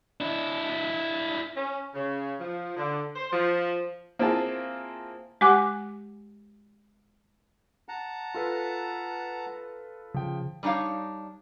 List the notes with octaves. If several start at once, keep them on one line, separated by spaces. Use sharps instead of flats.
D4 E4
C#4
C#3
F3
D3
C5
F3
A#3 C4 E4 F4 G#4 A5
G#3 G4 F#5 G#5 D6 F#6
F#5 A5 A#5
F4 A4 B4
C#3 F3 G5
G3 D4 D#4 C#5 F5